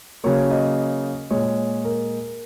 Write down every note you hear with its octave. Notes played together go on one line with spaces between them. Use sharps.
C#3 F#3 A#3 C#5
D#5
A#2 G#3 C#5
A#4